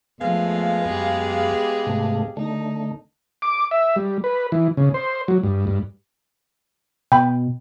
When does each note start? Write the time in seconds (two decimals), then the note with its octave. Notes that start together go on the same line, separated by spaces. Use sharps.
0.20 F2 F3 G#3 A3 B3 F5
0.85 F#2 G4 G#4 B4
1.86 G#2 C3 A3
2.37 D3 A3 D#4
3.42 D6
3.71 E5
3.96 G3
4.24 B4
4.52 E3
4.77 C#3
4.94 C5
5.28 F#3
5.43 G2
5.67 G2
7.12 B2 G5 B5